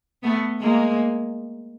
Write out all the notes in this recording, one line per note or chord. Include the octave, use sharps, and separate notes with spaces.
A3 B3
G#3 A#3